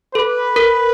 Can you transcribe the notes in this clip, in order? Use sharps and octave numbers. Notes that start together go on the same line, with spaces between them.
A4 B4
A#4